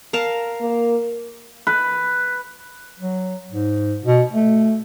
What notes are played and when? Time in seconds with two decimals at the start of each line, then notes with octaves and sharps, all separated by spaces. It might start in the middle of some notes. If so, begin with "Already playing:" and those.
0.13 A#4 F5 A5
0.60 A#3
1.67 B4
2.99 F#3
3.51 G#2
4.04 B2
4.32 A3